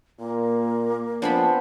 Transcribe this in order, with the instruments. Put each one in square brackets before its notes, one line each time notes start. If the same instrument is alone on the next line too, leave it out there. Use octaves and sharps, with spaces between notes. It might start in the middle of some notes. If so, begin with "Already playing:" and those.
[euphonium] A#2 [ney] A#3
[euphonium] F3 [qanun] B3 C4 C5 [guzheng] D4 G#4 B5